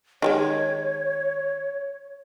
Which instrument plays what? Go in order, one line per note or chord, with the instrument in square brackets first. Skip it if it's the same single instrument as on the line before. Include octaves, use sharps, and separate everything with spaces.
[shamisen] D#3 G3 G#3 [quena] C#5